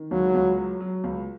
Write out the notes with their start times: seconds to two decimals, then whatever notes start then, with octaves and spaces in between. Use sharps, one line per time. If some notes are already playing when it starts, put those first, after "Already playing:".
Already playing: D#3
0.11 C#2 F#3
0.35 C#2
0.58 F#3
0.80 F#3
1.04 C#2